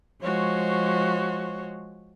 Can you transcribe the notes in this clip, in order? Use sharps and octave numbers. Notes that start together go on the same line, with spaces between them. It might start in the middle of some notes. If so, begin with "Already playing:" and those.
F3 G#3 F#4 C5 C#5